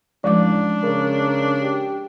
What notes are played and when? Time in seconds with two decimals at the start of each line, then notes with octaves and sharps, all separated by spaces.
0.24 A1 F3 G#3 D4 D6
0.83 C#3 A#4
1.61 G4